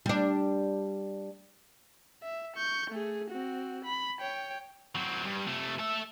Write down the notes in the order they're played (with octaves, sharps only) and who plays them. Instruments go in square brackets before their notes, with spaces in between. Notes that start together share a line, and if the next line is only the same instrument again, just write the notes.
[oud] G3 D4
[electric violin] E5
C#6 G6
A3 G#4
C4 F#4
B5
C#5 G5
[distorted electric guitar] F#3 C4
G2
C3 A3
A4 E5